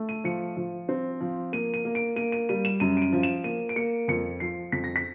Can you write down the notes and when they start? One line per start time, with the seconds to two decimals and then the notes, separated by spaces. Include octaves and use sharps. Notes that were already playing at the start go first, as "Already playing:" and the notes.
Already playing: A3
0.09 D#7
0.24 F3 C#7
0.57 F3
0.89 C4
1.21 F3
1.53 A#3 D#7
1.74 D#7
1.85 A#3
1.95 D7
2.16 A#3 D#7
2.32 D#7
2.49 G3 D#7
2.65 E7
2.80 F#2 D#7
2.97 D7
3.02 D#7
3.13 F3
3.23 E7
3.44 A#3 D#7
3.69 D7
3.76 A#3 C#7
4.08 F2 C#7
4.40 F3 C7
4.72 F2 B6
4.84 A#6
4.96 B6